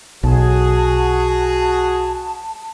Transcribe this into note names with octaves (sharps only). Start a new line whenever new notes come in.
B1 F#4 G#4 A5